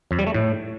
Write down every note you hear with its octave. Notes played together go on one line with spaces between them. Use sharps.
F2
G3
A3
A2